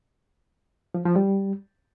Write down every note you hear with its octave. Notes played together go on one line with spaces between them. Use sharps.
F3
F3
G3